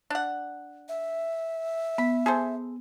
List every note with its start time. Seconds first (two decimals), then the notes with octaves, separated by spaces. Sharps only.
0.10 D4 F#5
0.89 E5
1.98 B3 B5
2.26 G#4 A4 C5